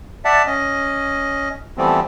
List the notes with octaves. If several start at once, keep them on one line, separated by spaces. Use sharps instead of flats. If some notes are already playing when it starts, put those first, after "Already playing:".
D5 E5 F#5 A5
C#4 D#5
E3 F3 G3 A3 B3 C4